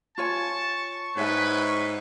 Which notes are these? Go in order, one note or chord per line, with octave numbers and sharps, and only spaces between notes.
F4 C#5 G#5 A5 C#6
G#2 B4 C#5 E5 G#5